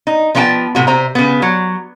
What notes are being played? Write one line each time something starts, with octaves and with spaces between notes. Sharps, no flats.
D#4
F3 B3 D#4 F4 G5 A5
A2 C3 F#4
C3 C5 E5 A#5
C#3 B3
F#3